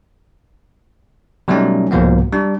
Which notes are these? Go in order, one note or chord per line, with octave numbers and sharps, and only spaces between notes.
B2 F#3 G3 A3 C#4 D#4
C2 G#2 B2 F3 A#3 B3
G3 D4